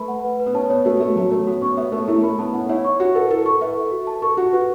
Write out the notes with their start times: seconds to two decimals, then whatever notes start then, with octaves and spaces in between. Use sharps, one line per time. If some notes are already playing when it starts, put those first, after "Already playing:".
Already playing: A3 B4 B5
0.08 F#5
0.24 B4
0.40 B4
0.46 B3
0.54 C#4 A5
0.70 B3 C#5
0.85 A3 F#4
1.00 A3 F#4
1.16 F#3 A5
1.31 A3 C#5
1.47 B3 F#4
1.62 C#4 C#6
1.77 B3 E5
1.92 A3 C#5
2.08 A3 E4
2.23 A3 B5
2.39 B3 A5
2.53 C#4 F#5
2.69 E4 C#5
2.85 C#6
3.00 F#4 F#5
3.15 A4 B4
3.30 E4 A4
3.45 A4 C#6
3.61 B4 E5
3.76 A4
3.91 F#4
4.07 A5
4.22 A4 C#6
4.37 F#4 F#5
4.53 F#4 B4